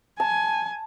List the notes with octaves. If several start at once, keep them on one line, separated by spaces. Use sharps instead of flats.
G#5 A5